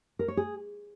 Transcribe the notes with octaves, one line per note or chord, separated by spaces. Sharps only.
A#4
C#5
G#4